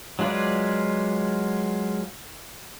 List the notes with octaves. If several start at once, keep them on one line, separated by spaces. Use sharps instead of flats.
F#3 G#3 F4 B4 D5